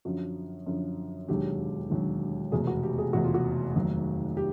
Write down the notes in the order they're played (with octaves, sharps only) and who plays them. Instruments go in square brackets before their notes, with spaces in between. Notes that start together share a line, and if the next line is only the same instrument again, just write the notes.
[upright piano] F#2 D3 F3 F#4
F#2 D3 F3
E1 D#2 D3 F#3 G4
E1 D#2 D3 F#3
F1 E2 B2 G#4
F#4
G4
G#4
F1 E2 B2 F#4
F4
F#4
F1 D#2 D#3 F#3
G4